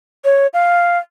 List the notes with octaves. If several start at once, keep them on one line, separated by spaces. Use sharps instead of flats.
C#5
F5